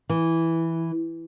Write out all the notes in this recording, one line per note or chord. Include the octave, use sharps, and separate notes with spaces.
E3